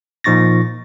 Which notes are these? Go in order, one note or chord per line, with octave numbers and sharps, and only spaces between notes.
A#2 F3 D#4 C#6 A6 A#6